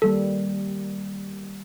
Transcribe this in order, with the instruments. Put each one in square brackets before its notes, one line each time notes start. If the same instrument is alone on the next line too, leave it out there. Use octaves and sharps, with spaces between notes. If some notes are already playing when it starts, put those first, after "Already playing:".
[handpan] D#3 G3 A#3 [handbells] A4